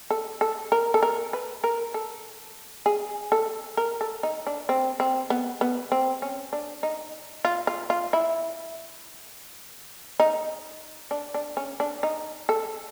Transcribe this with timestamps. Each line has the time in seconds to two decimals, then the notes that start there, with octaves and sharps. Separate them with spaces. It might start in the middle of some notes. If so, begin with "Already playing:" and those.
0.10 A4
0.41 A4
0.72 A#4
0.94 A4
1.03 A#4
1.33 B4
1.64 A#4
1.94 A4
2.86 G#4
3.32 A4
3.77 A#4
4.01 A4
4.23 D#4
4.47 D4
4.69 C4
5.00 C4
5.30 B3
5.61 B3
5.92 C4
6.22 C#4
6.53 D4
6.83 D#4
7.45 F4
7.67 F4
7.90 F4
8.13 E4
10.20 D#4
11.11 D4
11.34 D4
11.57 C#4
11.80 D4
12.03 D#4
12.49 A4